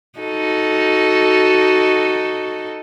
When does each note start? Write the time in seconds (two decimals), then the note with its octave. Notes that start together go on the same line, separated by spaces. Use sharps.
0.19 D#4 F#4 A4